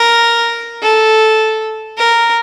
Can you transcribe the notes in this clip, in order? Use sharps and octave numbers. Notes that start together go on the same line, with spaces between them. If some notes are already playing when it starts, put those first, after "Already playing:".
Already playing: A#4
A4
A#4